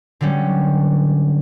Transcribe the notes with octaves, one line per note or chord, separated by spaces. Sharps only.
D3 F#3 G3 C#4